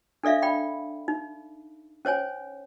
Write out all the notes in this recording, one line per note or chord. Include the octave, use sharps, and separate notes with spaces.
D4 A4 D5 E5 F5
D5 G5 B5
D#4
C#4 C5 C#5 G#5